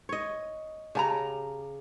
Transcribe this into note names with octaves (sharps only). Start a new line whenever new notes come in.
C#5 D#5
C#3 G4 A5 A#5